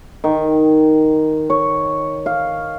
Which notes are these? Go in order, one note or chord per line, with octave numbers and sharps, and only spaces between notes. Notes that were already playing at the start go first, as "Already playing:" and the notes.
D#3
C#5
F5